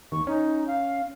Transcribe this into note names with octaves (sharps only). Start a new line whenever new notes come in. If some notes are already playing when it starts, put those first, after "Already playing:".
D#2 C#6
C#4 D#4
F5